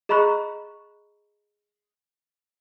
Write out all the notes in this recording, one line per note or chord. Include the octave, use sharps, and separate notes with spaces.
G#4 D#5 A#5 B5 C#6 F#6